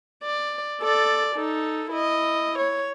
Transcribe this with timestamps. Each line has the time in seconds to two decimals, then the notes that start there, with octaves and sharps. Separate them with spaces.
0.23 D5
0.82 A4 D5
1.35 D#4 A4
1.91 E4 D#5
2.59 C#5